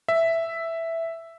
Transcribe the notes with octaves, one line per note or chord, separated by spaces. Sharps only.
E5